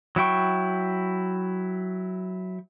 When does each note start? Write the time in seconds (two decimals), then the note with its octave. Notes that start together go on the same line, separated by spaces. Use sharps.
0.16 F#3 E4 G5 C#6